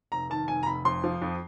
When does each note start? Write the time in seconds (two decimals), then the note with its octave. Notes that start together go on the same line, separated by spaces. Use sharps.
0.12 F1 A#5
0.30 D#3 A5
0.48 F1 G#5
0.63 A#5
0.66 F1 B5
0.85 F2 C6
1.04 F3
1.22 F2